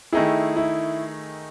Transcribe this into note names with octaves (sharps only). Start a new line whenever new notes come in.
D#3 A3 D#4 E4 G#4
E4